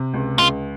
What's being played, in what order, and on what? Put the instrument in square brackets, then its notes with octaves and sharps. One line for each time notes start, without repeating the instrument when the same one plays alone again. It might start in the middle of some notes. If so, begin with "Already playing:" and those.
Already playing: [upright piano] C3
C#2
[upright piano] C#2 [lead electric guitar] F4